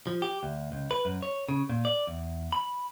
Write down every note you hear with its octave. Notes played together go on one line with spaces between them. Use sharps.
F3
G4
D2
C#2
B4
F#2
C#5
C#3
A#2
D5
E2
B5